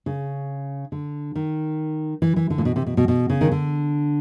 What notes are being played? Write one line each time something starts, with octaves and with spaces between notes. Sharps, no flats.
C#3
D3
D#3
E3
E3
D3
A#2
B2
C3
B2
B2
B2
C#3
D#3
D3